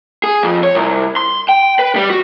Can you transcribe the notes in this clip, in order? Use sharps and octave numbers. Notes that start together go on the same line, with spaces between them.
G#4
F2
C#5
C2
C6
G5
B4
G3
F#4